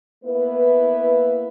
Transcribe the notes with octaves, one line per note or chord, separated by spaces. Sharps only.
A#3 B3 E4 B4